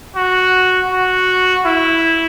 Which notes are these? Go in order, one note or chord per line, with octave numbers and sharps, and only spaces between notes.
F#4
F#4
E4